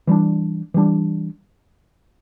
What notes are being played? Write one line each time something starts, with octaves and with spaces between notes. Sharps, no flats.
E3 G3 D4
E3 G3 D4